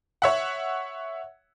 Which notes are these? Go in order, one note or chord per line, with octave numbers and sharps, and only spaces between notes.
C#5 E5 F#5